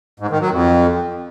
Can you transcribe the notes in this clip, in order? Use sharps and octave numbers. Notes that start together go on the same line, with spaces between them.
G#2
D#3
F#3
F2